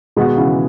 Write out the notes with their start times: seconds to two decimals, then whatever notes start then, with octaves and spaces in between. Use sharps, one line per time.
0.16 B2 D#3 G#3 B3 F#4
0.37 C#3 E3